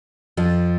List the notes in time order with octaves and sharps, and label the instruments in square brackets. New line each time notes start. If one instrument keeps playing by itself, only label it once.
[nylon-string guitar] F2 F3